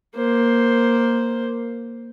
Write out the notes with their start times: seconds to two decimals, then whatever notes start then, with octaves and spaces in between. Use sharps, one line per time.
0.16 A#3 C5